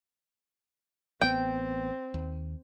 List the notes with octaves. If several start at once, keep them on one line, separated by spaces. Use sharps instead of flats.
A1 B3 C4 G5
D#2